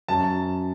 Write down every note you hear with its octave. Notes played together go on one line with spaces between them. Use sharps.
F#2 A5